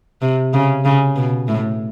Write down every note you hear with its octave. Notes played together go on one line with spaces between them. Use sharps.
C3
C#3
C#3
B2
A2